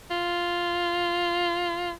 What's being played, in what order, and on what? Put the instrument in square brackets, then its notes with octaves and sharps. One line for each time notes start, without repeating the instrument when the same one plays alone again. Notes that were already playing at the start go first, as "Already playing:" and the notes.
[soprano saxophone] F4